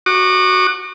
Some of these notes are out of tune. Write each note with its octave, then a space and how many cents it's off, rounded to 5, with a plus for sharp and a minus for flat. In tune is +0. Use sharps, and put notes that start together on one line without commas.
F#4 +0 D6 +45